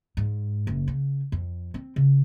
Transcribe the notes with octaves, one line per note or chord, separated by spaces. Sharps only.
G#2
F#1
C#3
F2
C4
C#3